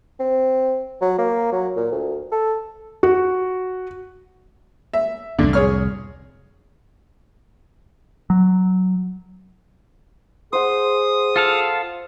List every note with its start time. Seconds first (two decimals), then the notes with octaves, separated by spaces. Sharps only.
0.20 C4
1.01 F#3
1.18 A#3
1.52 F#3
1.77 A#2
1.92 D2
2.32 A4
3.03 F#4
4.93 E5
5.39 C2 F2 A2 D3
5.53 G#4 C#5 F6
8.30 F#3
10.53 G#4 C5 F#5 D#6
11.36 F4 A4 F5